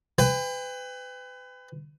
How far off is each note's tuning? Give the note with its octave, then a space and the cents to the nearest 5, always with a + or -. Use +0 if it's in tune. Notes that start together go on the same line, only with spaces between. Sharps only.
B4 +35 G5 +40